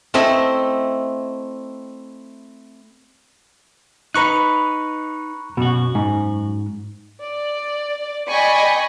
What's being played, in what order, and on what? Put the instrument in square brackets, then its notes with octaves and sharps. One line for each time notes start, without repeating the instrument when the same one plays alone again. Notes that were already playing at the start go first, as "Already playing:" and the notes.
[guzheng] A3 C4 E4 D#5 E5
[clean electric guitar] D#4 B4 [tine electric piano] A#5 C#6 F#6
[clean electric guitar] F#2 F#4 [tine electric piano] B2
[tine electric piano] G#2
[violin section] D5
D5 D#5 G5 G#5 B5 C#6